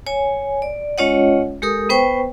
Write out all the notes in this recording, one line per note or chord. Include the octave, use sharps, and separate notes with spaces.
C#5 G#5
D5
G#3 C#4 F4 C#5 D#5 F#5
G#3 G4 A4 A#4 D#6
B3 B4 C5 G5 C#6